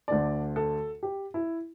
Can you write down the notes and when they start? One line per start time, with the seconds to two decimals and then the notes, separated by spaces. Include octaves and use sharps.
0.08 D2 D3 A3 D5
0.56 A4
1.03 G4
1.34 E4